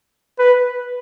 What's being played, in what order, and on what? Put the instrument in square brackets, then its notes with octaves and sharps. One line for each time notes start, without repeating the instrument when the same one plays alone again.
[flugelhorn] B4